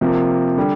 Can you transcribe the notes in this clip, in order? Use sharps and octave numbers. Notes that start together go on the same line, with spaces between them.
C3 F3 A#3
D3 G3